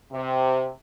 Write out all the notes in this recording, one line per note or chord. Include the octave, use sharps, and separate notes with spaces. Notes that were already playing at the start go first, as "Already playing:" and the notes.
C3